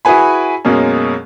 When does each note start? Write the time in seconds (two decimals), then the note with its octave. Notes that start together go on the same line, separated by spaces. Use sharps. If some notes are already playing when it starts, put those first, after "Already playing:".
0.05 E4 F#4 G#4 B4 G#5 B5
0.65 F#2 B2 G#3 A#3 C#4